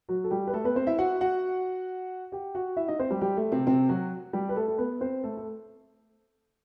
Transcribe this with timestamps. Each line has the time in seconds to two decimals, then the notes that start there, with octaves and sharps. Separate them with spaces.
0.09 F#3 F#4
0.24 A4
0.31 G3 G4
0.47 B4
0.53 A3 A4
0.64 B3 B4
0.76 C4 C5
0.87 E4 E5
0.98 F#4 F#5
1.21 F#4 F#5
2.32 G4 G5
2.55 F#4 F#5
2.77 E4 E5
2.88 D#4 D#5
2.99 C4 C5
3.10 G3 G4
3.21 G3 G4
3.37 A3
3.52 C3 C4
3.67 C3 C4
3.89 F#3 F#4
4.33 G3 G4
4.49 B4
4.56 A3 A4
4.68 A4
4.78 B3 B4
5.01 C4 C5
5.24 A3 A4
5.37 A4